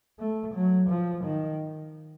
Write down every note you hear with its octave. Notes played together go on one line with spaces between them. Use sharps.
A3
F#3
F3
D#3